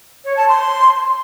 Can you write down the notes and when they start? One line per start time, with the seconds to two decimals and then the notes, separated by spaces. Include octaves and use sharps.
0.25 C#5
0.37 A5
0.48 C6